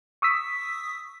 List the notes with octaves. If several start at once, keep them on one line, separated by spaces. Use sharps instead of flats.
C#6 D#6 E6 B6